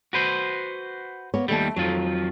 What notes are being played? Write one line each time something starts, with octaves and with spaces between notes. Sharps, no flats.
F#4 B4 C5
A#3 B3 C#5
D#2 G3 A3 A5
F2 D#3 F#3 F4